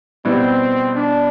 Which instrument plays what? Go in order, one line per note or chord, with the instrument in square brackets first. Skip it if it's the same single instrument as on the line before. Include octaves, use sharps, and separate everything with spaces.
[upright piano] B2 G3 B3 E4 [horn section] C4
[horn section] D4